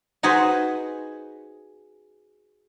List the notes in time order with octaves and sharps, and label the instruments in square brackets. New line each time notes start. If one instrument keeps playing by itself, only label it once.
[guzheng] D#4 F#4 G#4 B4 C5